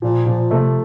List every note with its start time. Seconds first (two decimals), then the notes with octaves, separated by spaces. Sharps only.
0.02 A#2 F3
0.26 A#2 F3
0.51 C3 A3